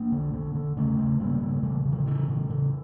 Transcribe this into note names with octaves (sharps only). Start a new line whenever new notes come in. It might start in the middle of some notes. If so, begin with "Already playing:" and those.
Already playing: A#3 D4
D3
D3
D3
C#3 A3 C#4
C#3
C#3 G3 A#3
C#3
C#3 E3 G3
C#3
D3 F3
C#3 E3
C#3 E3
C#3